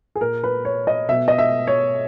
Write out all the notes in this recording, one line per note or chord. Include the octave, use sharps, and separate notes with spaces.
G#4
A#2 A#4
B4
C#5
D#5
B2 E5
D#5
E5
C#5